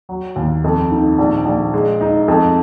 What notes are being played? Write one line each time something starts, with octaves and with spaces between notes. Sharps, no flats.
F#3
D#2
F2
D#3
A#1
A#1
G#3
D#4
F2